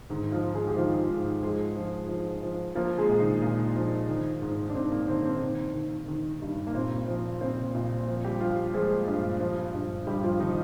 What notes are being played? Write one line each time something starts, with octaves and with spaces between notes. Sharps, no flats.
G#2 D#3 D#4
F3 F4
D#3
G#3 G#4
G4
D#3 F3 F4
G#2
F3 G#3 G#4
F3
F3
F3
F3 A#3 A#4
G#3 G#4
A#2
D#3 D#4
A#2
F3
D#3
G#2
D4
G#2 C4
A#3
D#3 C4
C4
D#3
D#3
D#3
G2
A#3
A#2 C4
F3
A#2 C4
A#2
F3
G3 G4
F3 F4
F3 G#3 G#4
G2
F3
G2
G2 G3 G4
F3 F4
D#3 F3 D#4